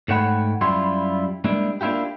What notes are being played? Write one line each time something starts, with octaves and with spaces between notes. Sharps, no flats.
G#2 A3 C#5 F#5 G5 B5
F#2 G3 E4 F4 C6
G3 G#3 A#3 D4 E4
A#3 D4 E4 F4 G4